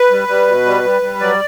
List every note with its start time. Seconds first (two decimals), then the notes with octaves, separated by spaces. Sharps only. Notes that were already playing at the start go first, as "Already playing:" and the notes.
Already playing: B4
0.11 G3
0.28 G3
0.47 B2
0.65 G3
0.84 G3
1.02 G3
1.20 F#3 D5